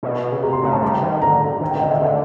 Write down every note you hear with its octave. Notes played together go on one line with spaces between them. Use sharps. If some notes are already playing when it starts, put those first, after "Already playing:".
B2
C#3
C3 A#5
C6
C#3 A#5
A5
G3 A#5
D#3
D3 A#5
D#3
D3 G5
D#5
D3 E5
D3 F5